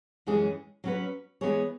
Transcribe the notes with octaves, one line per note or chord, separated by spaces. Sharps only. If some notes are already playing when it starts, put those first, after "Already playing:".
F#2 E3 G#3 C#4 G#4
F#3 C#4 F#4 B4
E3 G#3 B3 G#4 C#5